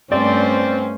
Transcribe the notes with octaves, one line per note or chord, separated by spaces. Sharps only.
G2 A3 C4 C#4 C5 D5